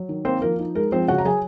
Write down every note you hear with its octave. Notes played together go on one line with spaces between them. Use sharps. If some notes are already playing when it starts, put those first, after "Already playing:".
Already playing: F#3
D#3
A#3 C4 C5
F3 A#4
D#4
G#3 A#4
F3 C4 C5
C#3 F#4 F#5
A#5
F#3 G#4 G#5